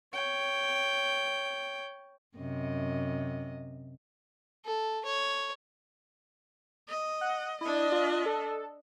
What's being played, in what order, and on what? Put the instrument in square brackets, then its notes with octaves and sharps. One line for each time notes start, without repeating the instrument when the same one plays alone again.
[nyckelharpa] C#5 G5
[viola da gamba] F#2 C3 D#5
[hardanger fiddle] A4
C#5
[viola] D#5
[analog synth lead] F#5
[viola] D4 D#5 [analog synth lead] E4
[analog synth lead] F4
A4